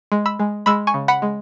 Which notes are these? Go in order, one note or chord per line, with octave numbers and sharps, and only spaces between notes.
G#3
B5 E6
G#3
G#3 B5 E6
G#5 C#6
C#3
F#5 B5
G#3